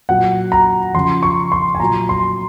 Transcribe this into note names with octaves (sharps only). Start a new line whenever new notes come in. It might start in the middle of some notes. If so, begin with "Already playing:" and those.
A#2 F#3 F#5
A#5
C#3 F3 C6
C#6
C6
G#5
A#2 F#3 A#5
C6